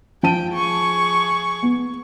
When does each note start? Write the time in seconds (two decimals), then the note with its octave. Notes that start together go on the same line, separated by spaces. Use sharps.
0.23 F3 G5 A5 D#7
0.53 G#4 C#6
1.63 B3